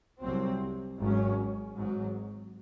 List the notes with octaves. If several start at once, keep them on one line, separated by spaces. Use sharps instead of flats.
C2 C3 F#3 C4
G#1 G#2 F#3 C#4
G#1 G#2 F#3